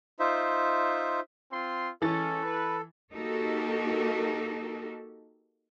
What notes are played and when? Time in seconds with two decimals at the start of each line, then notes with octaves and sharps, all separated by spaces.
0.19 D#4 F4 C5 E5
1.50 C4 F4 C6
2.02 E3 G#3 C#4 A4 A6
2.43 B4
3.13 A#3 D#4 F#4 G4 A4 A#4